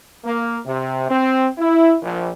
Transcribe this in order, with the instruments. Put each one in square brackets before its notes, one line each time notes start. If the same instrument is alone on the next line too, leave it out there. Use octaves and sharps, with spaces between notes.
[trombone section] A#3
C3
C4
E4
A#1